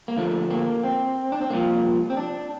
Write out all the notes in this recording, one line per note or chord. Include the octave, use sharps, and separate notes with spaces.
A#3
D2 D3 F3 A3
A#3
C4
D4
C4
C2 A#2 F3 A#3
C4
D4